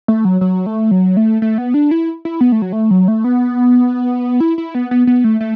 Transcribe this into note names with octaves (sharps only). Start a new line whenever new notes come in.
A3
F#3
F#3
A3
F#3
A3
A3
B3
D4
E4
E4
B3
A3
F#3
A3
F#3
A3
B3
E4
E4
B3
B3
B3
A3
A3